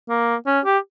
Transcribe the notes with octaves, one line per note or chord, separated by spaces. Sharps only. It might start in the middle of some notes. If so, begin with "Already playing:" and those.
A#3
C#4
G4